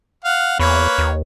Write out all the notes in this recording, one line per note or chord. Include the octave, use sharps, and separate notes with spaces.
F5 F#5
E2 A#3 B4 C#5
D#2